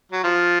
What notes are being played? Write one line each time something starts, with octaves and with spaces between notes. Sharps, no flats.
F#3
F3